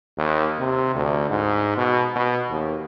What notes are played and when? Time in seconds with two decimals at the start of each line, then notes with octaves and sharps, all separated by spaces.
0.18 D#2
0.59 C3
0.95 D2
1.30 G#2
1.77 B2
2.15 B2
2.50 D#2